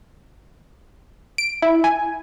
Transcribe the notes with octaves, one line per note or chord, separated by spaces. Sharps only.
D7
E4
G#5